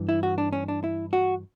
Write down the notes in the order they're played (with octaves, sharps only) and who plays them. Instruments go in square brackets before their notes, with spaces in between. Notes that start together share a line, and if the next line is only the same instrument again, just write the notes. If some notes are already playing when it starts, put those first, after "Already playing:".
Already playing: [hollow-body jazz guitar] G2 E3
E4
F#4
D4
C#4
D4
E4
F#4